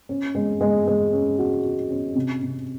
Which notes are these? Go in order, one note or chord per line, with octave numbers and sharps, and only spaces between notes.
C#4
G#3
G#3
G#3
C#4
F#4
F#4
C#4
C3
C3